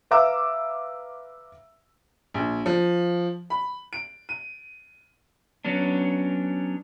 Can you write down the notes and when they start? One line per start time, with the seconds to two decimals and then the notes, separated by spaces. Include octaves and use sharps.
0.11 B4 E5 F5 A#5 D6 E6
2.34 A#1
2.66 F3
3.50 B5
3.93 D7
4.29 D#7
5.65 F#3 B3 C#4 D4